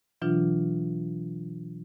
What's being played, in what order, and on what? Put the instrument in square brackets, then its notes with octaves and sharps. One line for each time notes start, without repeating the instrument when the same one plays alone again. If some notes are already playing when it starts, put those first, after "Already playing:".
[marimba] B2 E3 F#3 D4 F4